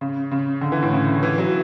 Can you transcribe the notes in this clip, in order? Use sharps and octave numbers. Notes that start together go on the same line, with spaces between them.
C#3
C#3
D3
E3
A2
C#3
E3
F#3